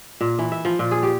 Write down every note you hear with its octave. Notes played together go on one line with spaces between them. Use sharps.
A#2
E3
E5
F3
A#2
G#4
G4